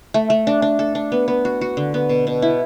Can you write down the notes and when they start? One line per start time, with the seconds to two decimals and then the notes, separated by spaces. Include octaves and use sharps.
0.14 A3
0.30 A3
0.47 D4
0.62 D4
0.79 A4
0.95 D4
1.12 B3
1.28 B3
1.45 F#4
1.61 F#4
1.77 D3
1.94 B3
2.09 B2
2.27 B2
2.42 E4